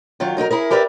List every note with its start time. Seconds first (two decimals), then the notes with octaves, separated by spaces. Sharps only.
0.20 D#3 F#3 F4
0.37 F#3 D#4 E4 A#4
0.51 E4 G#4 A#4
0.71 G4 A#4 B4 D5 E5